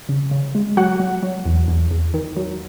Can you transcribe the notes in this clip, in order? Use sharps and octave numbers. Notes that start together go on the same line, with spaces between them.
C#3
C#3
G#3
F#3 F#4 F#5
F#3
F#3
E2
E2
E2
D#3
F#3